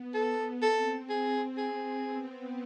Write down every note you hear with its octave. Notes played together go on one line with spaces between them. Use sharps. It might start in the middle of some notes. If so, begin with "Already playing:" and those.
Already playing: B3
A4
C4 A4
G#4
C4 G#4
B3